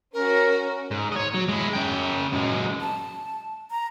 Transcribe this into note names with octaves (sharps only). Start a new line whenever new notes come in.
C#4 F#4 A#4
G#2
C#5 D#5
F#3
G#3 E4
C#3 G5
F#2 G#3
A5
A#5